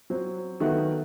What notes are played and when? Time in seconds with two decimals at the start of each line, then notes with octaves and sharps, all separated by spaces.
0.10 F#3 C4 C5
0.60 D#3 F#3 A3 B3 D#4 F#4